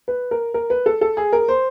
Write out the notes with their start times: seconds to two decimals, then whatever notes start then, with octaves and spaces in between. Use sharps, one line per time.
0.08 B4
0.31 A#4
0.54 A#4
0.70 B4
0.86 A4
1.01 A4
1.17 G#4
1.33 A#4
1.48 C5